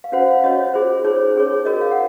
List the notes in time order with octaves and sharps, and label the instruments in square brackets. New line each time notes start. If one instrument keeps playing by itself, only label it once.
[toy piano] F5
C#4 F#4 C5 F#5
F5
C#4 F#4 C#5 D#5
F4 G#4 C5
D#4 G#4 C5 C#5
C#4 G#4 C#5
F#4 A#4 C#5 D#5
F5
F#5